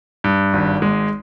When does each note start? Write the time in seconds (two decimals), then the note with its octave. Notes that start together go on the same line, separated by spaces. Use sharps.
0.24 G2
0.53 G#1
0.82 G#3